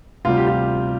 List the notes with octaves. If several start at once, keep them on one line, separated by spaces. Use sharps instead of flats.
D2 C3 G3 F4
G4
F4